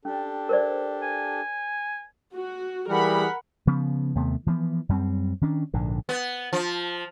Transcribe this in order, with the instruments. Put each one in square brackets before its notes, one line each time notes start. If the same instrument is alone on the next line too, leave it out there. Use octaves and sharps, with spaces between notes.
[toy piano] C#4 [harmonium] D4 G4 A4
[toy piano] A#4 C5 D5
[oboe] G#5
[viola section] F#4
[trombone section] E3 G3 G#4 [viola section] A#4 F#5 B5
[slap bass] C#3 F3 B3
D#2 C3 A3 B3
E3 F3 A3 B3
F#2 G3 A3 C4
D#3 C#4 D4
A#1 G#2 D3
[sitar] B3
F3